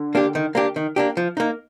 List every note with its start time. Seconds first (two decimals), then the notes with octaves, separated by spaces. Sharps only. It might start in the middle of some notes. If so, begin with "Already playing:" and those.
Already playing: D3
0.15 A#3 D4 G4
0.35 D#3
0.55 A#3 D4 G4
0.76 D#3
0.96 A#3 D4 G4
1.17 F3
1.37 A#3 D#4